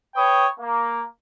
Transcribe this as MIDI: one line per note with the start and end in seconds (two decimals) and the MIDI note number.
0.15 0.47 71
0.15 0.47 73
0.15 0.47 79
0.15 0.47 85
0.15 0.47 87
0.59 1.02 58